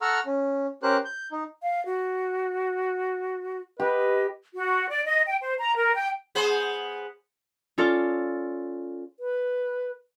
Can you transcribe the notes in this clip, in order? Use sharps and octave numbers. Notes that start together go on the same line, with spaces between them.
A4 F#5 A#5 C#6 E6 F6
C#4
C#4 G4 A#4 C5 F#6
G6
D#4
F5
F#4
G4 B4 D#5
F#4
D5
D#5
G5
C5
A#5
A#4
G5
B3 G#4 C5
C#4 F4 A4 D5
B4